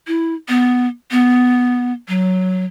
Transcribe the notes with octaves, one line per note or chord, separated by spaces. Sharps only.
E4
B3
B3
F#3